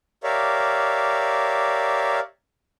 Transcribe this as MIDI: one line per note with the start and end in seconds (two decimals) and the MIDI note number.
0.24 2.20 67
0.24 2.20 70
0.24 2.20 73
0.24 2.20 74
0.24 2.20 76
0.24 2.20 77